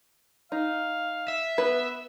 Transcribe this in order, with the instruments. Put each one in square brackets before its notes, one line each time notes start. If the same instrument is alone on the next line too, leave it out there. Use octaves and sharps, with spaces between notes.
[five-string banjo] D#4 [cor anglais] F5
[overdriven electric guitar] E5
[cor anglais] B3 [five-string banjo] B4